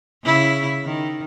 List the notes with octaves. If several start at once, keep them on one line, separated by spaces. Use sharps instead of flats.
C#3 E4
D#3